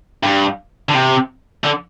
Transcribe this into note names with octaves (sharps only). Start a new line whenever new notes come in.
G2
D3
C3
D3